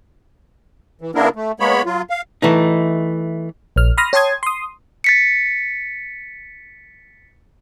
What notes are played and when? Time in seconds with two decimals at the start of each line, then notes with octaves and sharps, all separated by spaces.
1.01 E3
1.15 C#3 A#3 B3 D4 E4 A#4
1.36 A3
1.60 G#3 A#3 B3 C#5 B5
1.86 F#3 F4
2.10 F5
2.42 E3 A3 D#4
3.76 A#1 F6
3.98 B5 C6 D#6 F6 A#6
4.13 C#5 G5 A5 C6 D#6 G#6
4.43 C6 D#6
5.04 A6 B6 C#7